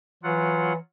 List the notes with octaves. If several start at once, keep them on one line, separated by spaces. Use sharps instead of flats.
E3 F#3 F4 F#5